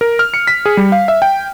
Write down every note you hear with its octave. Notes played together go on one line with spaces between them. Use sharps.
A#4
F6
C#7
B6
G#4
G3
F5
E5
G5